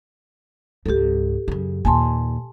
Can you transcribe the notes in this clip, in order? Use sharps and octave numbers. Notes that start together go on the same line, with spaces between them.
C#2 G#2 G4 A4
F#2 C#3
D#2 A#2 G#5 A5 C6